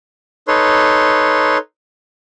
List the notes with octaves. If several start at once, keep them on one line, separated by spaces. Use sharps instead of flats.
D#4 A4 B4 C#5 C6